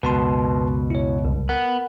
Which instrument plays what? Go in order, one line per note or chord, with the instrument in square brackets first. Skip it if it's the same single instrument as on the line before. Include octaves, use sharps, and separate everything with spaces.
[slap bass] C#2 F#2 [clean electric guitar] B2 [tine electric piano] B4 A5 C6
[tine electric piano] E4 C#5
C2
[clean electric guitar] B3 [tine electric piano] A#4 F#5